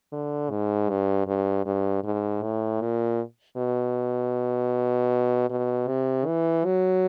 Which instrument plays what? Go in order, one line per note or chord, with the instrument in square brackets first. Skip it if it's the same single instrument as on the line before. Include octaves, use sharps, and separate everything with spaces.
[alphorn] D3
G#2
G2
G2
G2
G#2
A2
A#2
B2
B2
C3
E3
F#3